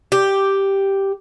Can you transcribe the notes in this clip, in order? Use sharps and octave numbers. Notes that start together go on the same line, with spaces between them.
G4